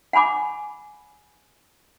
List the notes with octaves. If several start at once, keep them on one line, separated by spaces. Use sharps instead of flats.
F#5 G#5 B5 D6